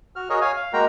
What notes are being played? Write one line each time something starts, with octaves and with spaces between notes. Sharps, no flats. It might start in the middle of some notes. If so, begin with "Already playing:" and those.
F#4 F6
F#4 G#4 A#4 C#5 D#5
C#5 F5 G#5
F5
G#3 A#3 F#4 A#4 G5 A#5